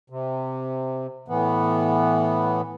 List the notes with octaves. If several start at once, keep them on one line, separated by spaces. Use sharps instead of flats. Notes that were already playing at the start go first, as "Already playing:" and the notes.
C3
A2 E3 B3